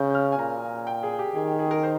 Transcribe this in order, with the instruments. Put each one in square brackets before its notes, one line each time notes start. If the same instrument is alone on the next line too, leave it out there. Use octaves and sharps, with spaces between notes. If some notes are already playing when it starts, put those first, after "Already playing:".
Already playing: [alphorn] C#3 [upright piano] G6
[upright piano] G6
F6
G#5
[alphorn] A#2 [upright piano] A#5
[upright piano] G5
G#4
G4
[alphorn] D#3 [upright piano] G#4
[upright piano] G#4
A#4
C5